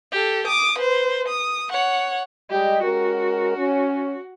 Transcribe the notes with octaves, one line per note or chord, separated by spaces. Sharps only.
G4 A4
D6 D#6
B4 C5
D#6
C#5 F#5
G3 G#3 G4 D#5
G#3 C#4 F#4 A#4
C#4